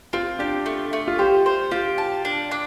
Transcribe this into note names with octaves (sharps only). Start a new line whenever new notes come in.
C4 F4
D4 G4
A3
A3
F4
G4 C5
C5
F4 G4
A5
D4
D4